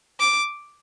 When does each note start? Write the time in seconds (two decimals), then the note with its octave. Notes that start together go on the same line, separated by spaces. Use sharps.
0.20 D6